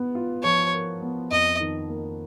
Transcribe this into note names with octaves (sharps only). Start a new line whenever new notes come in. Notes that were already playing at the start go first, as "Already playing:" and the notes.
Already playing: B3
F4
F3 C#5
A#4
B3
F2 D#5
D#3
A#3